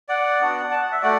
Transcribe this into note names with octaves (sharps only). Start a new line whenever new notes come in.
D5 F#5
B3 D4 F#4
A5
F#5
E5
A3 F#4 D5 F#5